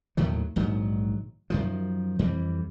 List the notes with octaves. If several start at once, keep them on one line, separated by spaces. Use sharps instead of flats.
D#2 A2 D#3 F#3
A#1 G#2 D#3 F#3
F#2 D#3 F3
F2 E3 G3